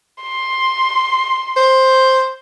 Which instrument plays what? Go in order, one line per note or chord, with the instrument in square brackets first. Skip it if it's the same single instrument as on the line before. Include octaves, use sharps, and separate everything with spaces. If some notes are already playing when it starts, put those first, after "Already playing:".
[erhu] C6
[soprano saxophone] C5